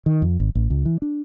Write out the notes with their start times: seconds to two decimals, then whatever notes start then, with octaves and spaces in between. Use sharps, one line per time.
0.06 D#3
0.22 F2
0.40 G#1
0.55 A1
0.70 C#2
0.85 E3
1.02 D4